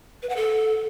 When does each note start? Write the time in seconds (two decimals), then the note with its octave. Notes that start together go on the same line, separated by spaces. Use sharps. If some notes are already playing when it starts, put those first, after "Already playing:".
0.22 B4
0.29 F#5
0.36 A4